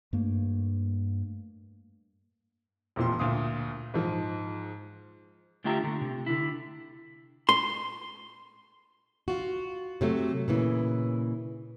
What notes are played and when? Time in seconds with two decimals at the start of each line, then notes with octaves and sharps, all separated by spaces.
0.13 G2 A3 A#3
2.96 E1 F2 A#2 F4 C6
3.19 D2 A#2 F5 D#6
3.94 G#2 F3
5.64 D3 A3 F4 G4 E5 A#5
5.84 D3 A3
6.01 C3
6.26 D3 E4
7.49 C6
9.28 F4 F#4
10.01 C3 F#3 A3
10.48 A#2 C#3 E3